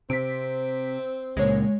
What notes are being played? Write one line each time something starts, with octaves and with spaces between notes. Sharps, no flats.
C3 C4 B6 D7
C#2 A#2 G#3 C#5